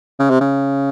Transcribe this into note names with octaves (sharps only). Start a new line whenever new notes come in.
C#3
C3
C#3